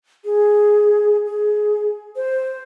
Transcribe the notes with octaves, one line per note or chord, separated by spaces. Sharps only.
G#4
G#4
C5